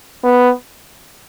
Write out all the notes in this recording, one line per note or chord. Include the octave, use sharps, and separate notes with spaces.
B3